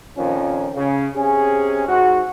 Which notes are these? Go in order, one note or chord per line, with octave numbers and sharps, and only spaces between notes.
F2 A#2 D#3 F3 C#4
C#3
C3 C#4 G#4
G#2 F#4